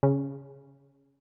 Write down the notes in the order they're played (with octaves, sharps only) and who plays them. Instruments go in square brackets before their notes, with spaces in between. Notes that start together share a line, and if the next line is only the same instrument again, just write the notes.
[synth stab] C#3